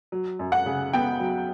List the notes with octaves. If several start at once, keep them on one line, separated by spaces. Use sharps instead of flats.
F#3
F#2
F#5
C#3
B3 G5
F#3